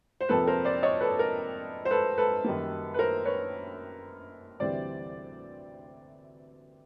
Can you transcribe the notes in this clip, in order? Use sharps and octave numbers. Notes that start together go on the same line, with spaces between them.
C5
F2 C3 F3 A#3 A4 B4
A#4 C5
C5 D5
C#5 D#5
A4 B4
A#4
C5
A4 B4
A4 B4
F#2 D#3 G3 A#3
B4
A#4 C5
B4 C#5
D2 C3 E3 G3 C5 D5